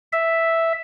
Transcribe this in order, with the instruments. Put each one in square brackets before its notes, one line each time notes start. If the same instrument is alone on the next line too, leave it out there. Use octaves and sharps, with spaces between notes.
[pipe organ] E5